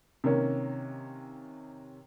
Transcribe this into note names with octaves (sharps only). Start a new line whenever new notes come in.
C3 D#3 A#3 C#4